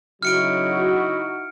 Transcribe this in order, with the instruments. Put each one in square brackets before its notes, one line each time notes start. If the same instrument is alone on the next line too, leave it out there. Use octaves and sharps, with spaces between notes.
[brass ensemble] C#3 F#3 [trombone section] D#4 E4 F#4 [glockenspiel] F6 C#7 D7